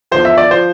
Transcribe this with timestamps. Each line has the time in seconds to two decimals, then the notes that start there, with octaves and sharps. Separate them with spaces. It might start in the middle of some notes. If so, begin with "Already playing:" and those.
0.11 E2 D3 F3 C5
0.25 E5
0.38 D5
0.51 F3 C5